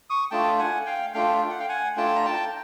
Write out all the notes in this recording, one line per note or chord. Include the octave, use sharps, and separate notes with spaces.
C#6 D#6
A3 D4 F4 G5 A5
F#5 G#5
F5 G5
A3 D4 F4 F5 G5
G5
F#5
F5 G5
F#5 G#5
A3 D4 F4 G5 A5
A#5
G5 A5